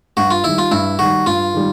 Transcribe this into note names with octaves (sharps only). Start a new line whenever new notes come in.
G2 F#4
F4
D#3 G3 E4
F4
G2 E4
D#3 G3 F#4
G2 F4
D#3 G3